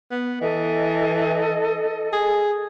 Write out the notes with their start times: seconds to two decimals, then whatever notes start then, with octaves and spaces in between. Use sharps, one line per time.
0.11 B3
0.41 E3 A4 D#5
2.13 G#4